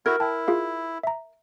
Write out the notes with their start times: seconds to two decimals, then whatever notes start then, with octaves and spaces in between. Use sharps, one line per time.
0.06 E4 F#4 A#4 G#6
0.20 E4 G5 A5
0.48 F4 G#4 F5
1.03 E5 A#5